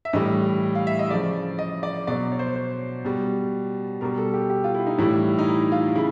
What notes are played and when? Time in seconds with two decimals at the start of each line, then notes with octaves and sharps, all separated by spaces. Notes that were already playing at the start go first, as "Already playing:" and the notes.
0.05 E5
0.13 A2 E3 G3 D#5
0.75 F5
0.87 E5
0.99 D#5
1.11 C#3 F3 D5
1.59 D#5
1.83 D5
2.07 B2 F#3 D5
2.32 C#5
2.39 C5
2.47 C#5
2.56 C5
3.05 B2 G3
4.01 B2 G3 A#4
4.18 A4
4.34 G4
4.50 G4
4.64 F4
4.74 E4
4.87 D#4
4.99 A2 E3 G3 E4
5.38 D#4
5.47 E4
5.72 F4
5.95 C#3 E4